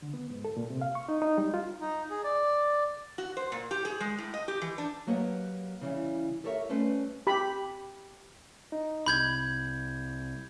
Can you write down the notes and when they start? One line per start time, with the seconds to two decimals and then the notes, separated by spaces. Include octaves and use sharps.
0.02 D3
0.14 B3
0.30 G#2
0.45 A4
0.57 A#2
0.70 C3
0.81 F5
0.95 C#6
1.09 D#4
1.22 D#4
1.38 G3
1.54 F4
1.81 D#4
2.10 G#4
2.24 D5
3.18 F#4
3.37 C5
3.52 A#2
3.71 G4
3.85 G#4
4.00 G#3
4.19 A2
4.34 D#5
4.48 G4
4.62 E3
4.78 D4
5.07 F#3 A#3 G4 B4 D#5 F#5
5.81 C#3 E3 G3
6.44 G4 A4 A#4 C#5 D5 E5
6.69 G3 A3 C#4 B4 C5
7.27 G4 B5
8.72 D#4
9.06 C2 B5 G6 G#6